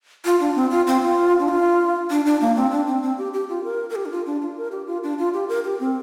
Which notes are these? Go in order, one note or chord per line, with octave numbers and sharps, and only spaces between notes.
F4
D4
C4
F4
C4
F4
D4
F4
D4
D4
A#3
C4
D4
C4
C4
G4
G4
F4
A#4
A#4
G4
D4
F4
D4
F4
A#4
G4
F4
D4
F4
G4
A#4
G4
C4